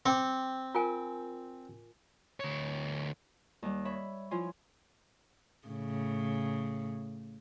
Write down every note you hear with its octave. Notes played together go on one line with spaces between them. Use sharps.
C4 G5 D6
F4 A#4 G#5
D2 C#5
D#2 G3
C#5 E5 B5
F3 E4 F4 C#5 G#5 C6
A2 C#3